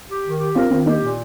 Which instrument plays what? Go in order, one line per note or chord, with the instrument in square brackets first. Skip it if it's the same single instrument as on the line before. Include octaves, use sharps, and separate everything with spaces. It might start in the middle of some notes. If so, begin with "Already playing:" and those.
[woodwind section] G4
D#3
G4
[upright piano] C4 F4 [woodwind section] A#4
[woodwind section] D#3 [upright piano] C4 F4
[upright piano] A#3 D#4 [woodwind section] G4
[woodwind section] A#2